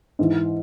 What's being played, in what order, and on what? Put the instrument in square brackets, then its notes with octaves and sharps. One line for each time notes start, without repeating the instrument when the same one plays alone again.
[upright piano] G#2 E3